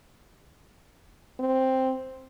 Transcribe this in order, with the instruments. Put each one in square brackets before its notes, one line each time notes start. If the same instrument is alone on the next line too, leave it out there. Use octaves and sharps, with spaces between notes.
[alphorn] C4